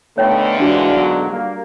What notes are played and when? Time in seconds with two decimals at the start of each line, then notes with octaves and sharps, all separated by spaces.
0.18 A#2 D3 A3 B3 D#4 C#5 G5
0.59 G#2 E3 D4 F#4
0.94 B1 G#2 F#3
1.30 G3 A#3